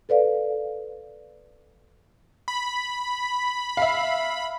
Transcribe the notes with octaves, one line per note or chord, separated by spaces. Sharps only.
A4 B4 D5 F5
B5
E5 F5